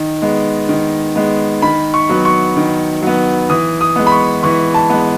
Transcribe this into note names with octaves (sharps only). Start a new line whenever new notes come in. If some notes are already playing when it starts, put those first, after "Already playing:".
Already playing: D#3
G#3 B3
D#3
G#3 B3
D#3 B5
C#6
F#3 B3
C#6
D#3
F#3 B3
E3 D#6
D#6
G#3 B3
B5
C#6
E3 C#6
A5
G#3 B3